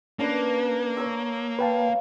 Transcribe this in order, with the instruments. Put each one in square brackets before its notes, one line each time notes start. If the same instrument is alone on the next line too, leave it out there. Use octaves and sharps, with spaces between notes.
[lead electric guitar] A#3 [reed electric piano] C#4 D4 [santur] B4 D5 A5
[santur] C#5 A#5 E6
[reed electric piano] B4 G5 A5 [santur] C#5 F5